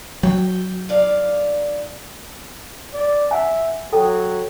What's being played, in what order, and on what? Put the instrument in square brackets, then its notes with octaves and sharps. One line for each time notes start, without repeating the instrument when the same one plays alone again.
[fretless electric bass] F#3 [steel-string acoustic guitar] G5
[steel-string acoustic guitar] D#2 D5 F5
[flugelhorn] D5
[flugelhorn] E5 [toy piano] F#5 G#5
[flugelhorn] F#3 [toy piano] A4 G5